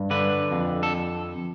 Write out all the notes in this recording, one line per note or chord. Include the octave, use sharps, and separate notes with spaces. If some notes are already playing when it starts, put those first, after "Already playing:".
Already playing: G2
D3 B4
F2
A4